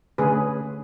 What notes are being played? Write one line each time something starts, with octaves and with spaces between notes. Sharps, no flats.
D3 A3 C#4 G#4 B4